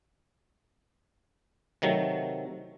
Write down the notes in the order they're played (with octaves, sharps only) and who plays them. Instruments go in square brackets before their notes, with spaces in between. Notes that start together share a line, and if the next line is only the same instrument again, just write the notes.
[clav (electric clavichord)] C3 D#3 F#3 A3